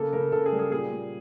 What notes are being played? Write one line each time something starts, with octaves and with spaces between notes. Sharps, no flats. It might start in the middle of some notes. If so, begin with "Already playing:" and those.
Already playing: C#3 A#3 A4
C#3 A#4
C#3 A4
G#4
G3
G#4
A#2 G#4
A#2